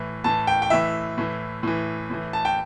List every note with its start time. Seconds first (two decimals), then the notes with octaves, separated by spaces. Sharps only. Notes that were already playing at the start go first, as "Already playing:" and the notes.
Already playing: A2 E3
0.24 A2 E3 A5
0.47 G5
0.62 G5
0.70 A2 E3 E5
1.18 A2 E3
1.63 A2 E3
2.10 A2 E3
2.33 A5
2.45 G5